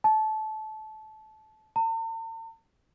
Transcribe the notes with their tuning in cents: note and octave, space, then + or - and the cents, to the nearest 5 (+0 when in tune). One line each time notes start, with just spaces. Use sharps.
A5 -20
A5 +45